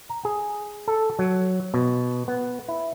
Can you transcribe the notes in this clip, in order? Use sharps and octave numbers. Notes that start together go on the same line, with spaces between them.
A#5
G#4
A4
F#3
B2
B3
E4